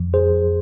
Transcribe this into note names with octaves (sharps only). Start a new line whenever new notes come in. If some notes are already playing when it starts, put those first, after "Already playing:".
Already playing: F2 F3
G#4 C5